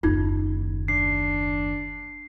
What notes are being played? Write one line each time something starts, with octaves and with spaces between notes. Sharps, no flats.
F#1 D#2 D#4 F4
D4 C7